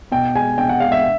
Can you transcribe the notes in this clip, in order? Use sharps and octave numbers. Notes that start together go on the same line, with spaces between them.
B2 G5
G#3 G#5
B2 G5
F#5
G#3 F5
E5